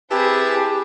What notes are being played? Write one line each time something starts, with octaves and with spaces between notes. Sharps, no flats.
C4 E4 G4 G#4 B4 E5 A5